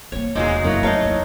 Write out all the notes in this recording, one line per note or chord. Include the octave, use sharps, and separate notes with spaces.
A3 A#3 C#5
E1 A#2 G#3 D#4 F#4
F#2 F3 F#3 A#3 E4
A3 D#4 C#5 F5 A5 A#5 C#6
D#2 E4